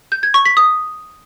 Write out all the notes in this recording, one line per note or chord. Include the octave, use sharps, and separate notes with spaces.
G6
G#6
C#6
B6
D#6